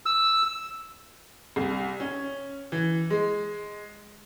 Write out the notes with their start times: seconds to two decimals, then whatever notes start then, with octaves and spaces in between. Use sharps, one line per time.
0.06 E6
1.56 C2
2.00 C#4
2.72 E3
3.10 G#3